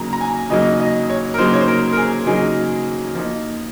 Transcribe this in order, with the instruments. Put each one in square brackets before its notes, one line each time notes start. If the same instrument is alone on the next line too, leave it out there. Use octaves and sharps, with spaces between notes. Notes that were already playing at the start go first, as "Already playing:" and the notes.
Already playing: [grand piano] C#3 F#3 A#3 D#4 A#5
A#5
G#5
C#3 F#3 A#3 D#4 D#5
D#5
C#5
A#4
C#3 F#3 A#3 D#4 C5
C#5
C5
A#4
A#4
G#4
C#3 F#3 A#3 D#4 G#4
F3 A#3 D#4